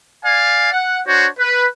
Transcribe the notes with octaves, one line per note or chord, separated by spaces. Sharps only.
D5 F5 G#5
F#5
D4 F#4 C5 C#5
B4